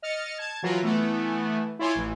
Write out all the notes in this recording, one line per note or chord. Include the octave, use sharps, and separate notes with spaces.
D#5 F6 A6 C#7
A5 G#6
E3 F#3 F4 A#4 B4
E3 A3 B3
E4 F4 C#5 G#5 C6 D6
A1 E3